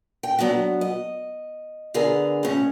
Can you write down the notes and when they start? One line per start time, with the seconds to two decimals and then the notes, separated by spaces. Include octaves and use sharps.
0.23 G5
0.39 F#3 B3 D4 F#4
0.81 D#5
1.94 D3 B3 G#4 A#4
2.43 A2 C#4